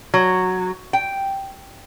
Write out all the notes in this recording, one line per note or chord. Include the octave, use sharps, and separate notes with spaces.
F#3
G5